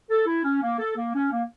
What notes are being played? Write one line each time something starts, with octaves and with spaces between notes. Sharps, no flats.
A4
E4
C#4
A#3
A4
A#3
C#4
A#3